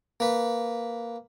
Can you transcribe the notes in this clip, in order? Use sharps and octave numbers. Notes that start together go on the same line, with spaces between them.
A#3 B4